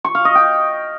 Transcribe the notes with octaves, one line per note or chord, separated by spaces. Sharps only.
C#6
F5
D#5
G5